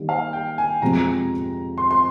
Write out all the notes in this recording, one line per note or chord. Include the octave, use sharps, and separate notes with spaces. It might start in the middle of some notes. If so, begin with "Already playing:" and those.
Already playing: D#3 G3 A#3
F5
G5
G#5
F2 C3 F3 G#3 A#5
C6
C6